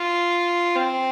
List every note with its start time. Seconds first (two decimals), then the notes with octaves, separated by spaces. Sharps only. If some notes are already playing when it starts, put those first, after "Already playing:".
Already playing: F4
0.75 C4